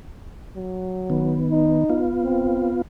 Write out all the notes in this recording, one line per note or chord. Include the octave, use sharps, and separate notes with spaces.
F#3
D#3 B3
D#4
B3 F4
C4